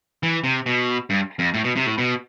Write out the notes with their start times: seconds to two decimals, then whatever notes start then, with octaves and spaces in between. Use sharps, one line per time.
0.23 E3
0.44 C3
0.66 B2
1.10 G2
1.39 F2
1.54 A2
1.64 B2
1.76 C3
1.87 A2
1.98 B2